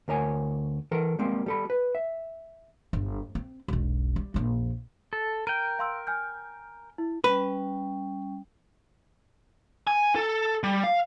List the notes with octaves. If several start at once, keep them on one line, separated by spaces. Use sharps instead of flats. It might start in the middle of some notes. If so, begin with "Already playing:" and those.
D2 A#4 C#5 G#5
E3 A4 A#4
G3 G#3 A#3 C4
G3 A4 B5
B4
E5
G1
C4
E1 B1
G3
A#1 F2
A4
A#4 G5 D#7
F5 C6 E6
G#5 F6 G6
E4
G3 C#4 B4 G5
G#5
A4
G3
F5